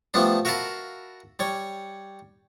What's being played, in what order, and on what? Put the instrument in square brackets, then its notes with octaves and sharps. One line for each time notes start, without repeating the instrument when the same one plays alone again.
[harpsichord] F3 G3 A3 B3 D4
F#4 A#4 E5 F5 A5 B5
G3 C#5